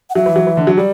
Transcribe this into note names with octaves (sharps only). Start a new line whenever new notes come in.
F#5
F#3 E5
E3
F#3
E3
D3
F#3
G3 D5